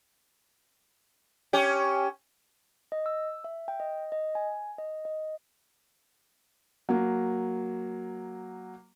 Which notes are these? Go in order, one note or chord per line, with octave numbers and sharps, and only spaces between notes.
C#4 G4
D#5
E6
E5
G5
D#5
D#5
G#5
D#5
D#5
F#3 A#3